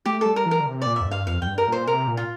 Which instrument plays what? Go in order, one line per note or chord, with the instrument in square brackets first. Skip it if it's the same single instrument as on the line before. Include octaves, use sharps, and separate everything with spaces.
[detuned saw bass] A3 [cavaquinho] G4
[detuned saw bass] G3 [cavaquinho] A4
[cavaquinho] A#4
[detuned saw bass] E3
[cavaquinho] A#4
[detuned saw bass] D3
C3
[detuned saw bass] A#2 [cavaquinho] D5
[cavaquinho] E5
[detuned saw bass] F2
[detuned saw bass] G2 [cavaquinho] F5
[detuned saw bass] F2 [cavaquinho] F5
[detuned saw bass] F2 [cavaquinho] G5
[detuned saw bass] G2
[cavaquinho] A#4
[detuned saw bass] A#2 [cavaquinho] C5
[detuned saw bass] C3 [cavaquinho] A#4
[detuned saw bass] A#2
[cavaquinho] F4